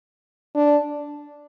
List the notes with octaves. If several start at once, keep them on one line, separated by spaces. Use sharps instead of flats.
D4